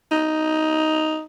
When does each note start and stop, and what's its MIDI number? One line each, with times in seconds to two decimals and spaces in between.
0.11 1.23 63